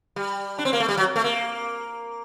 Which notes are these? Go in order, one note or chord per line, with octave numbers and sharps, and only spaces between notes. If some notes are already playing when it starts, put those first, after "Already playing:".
G3
D4
C4
A#3
A3
G3
F#3
A3
A#3